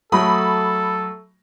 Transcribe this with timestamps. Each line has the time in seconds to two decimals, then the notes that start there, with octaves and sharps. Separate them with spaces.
0.12 F#3 A3 A4 B5 D#6